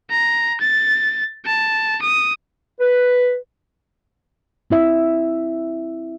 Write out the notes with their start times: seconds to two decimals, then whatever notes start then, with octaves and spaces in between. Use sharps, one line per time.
0.10 A#5
0.60 A6
1.45 A5
2.02 D#6
2.80 B4
4.70 C4 E4 E5